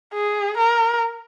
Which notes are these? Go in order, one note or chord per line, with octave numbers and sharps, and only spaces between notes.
G#4
A#4